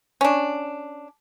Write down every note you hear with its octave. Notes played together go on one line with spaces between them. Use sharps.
C#4 D4